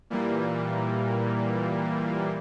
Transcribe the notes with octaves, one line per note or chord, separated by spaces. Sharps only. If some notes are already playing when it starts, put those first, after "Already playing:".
A#2 E3 G3 A#3